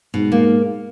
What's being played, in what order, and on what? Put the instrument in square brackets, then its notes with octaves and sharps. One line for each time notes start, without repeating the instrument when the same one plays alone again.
[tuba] G#2 [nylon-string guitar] B2
[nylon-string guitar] A#3